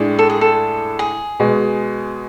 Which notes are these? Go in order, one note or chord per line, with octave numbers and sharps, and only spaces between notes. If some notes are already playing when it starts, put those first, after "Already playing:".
Already playing: A2 G#3 D4
A4
G#4
A4
G#4
B2 G#3